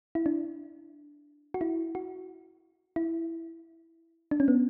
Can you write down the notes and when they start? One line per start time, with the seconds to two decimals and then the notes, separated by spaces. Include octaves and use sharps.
0.15 E4
0.26 D4
1.54 F#4
1.61 E4
1.95 F#4
2.96 E4
4.31 D4
4.40 C#4
4.48 B3